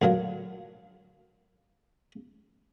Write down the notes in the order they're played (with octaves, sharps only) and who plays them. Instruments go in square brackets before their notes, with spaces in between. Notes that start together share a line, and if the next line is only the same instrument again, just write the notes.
[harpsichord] D2 A#2 F#3 A#3